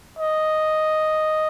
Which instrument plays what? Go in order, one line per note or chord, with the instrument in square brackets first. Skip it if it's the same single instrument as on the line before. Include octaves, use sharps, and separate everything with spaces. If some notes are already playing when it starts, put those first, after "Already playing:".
[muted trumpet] D#5